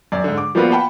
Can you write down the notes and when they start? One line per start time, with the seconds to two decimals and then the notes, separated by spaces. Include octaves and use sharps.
0.12 F#2 D5
0.24 G#2 D3
0.38 D6
0.55 F3 G3 A#3 B3 F4 F#4
0.71 F#5 G5 A5 B5